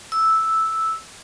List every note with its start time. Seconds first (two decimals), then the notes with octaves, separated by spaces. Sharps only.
0.12 E6